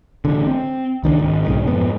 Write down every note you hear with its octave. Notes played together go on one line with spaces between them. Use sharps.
A1 D3
C4
C#2 D#3 C#4 D4
G#1
B1 G#2 C#3
F2 G#2 B3